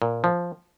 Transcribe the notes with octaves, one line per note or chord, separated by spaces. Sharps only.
A#2
F3